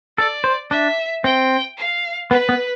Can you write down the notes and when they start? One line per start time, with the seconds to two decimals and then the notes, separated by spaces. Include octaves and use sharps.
0.18 A4 D5
0.44 C5
0.71 D4 E5
1.24 C4 G5
1.78 F5
2.31 B3 B4
2.49 B3